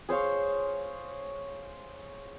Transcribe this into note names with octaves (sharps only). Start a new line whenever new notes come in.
G#4 C5 C#5 F5